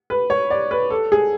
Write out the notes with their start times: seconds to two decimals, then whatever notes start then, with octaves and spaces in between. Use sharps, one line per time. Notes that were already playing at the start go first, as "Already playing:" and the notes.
0.10 B4
0.30 C#5
0.50 D5
0.71 B4
0.90 A4
1.12 G#4